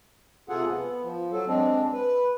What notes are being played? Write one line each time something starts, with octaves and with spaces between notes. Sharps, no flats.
C3 F4 G#4 A4 F#5
B3
F3
F#3 A4
G#3 C4 D4
B4